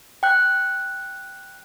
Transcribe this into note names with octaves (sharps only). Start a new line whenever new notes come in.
G5 F#6